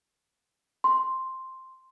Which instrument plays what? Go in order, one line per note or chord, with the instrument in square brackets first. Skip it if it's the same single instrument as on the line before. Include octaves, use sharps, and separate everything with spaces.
[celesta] C6